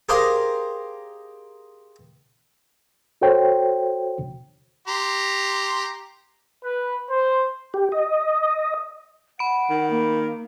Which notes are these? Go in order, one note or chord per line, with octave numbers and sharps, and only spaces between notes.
G4 G#4 A#4 C5 D#5 F5
F#4 A4 C5 C#5 G5
G4 A#5 C6
B4
C5
G4
D#5
F#5 B5 D7
D#3
A#3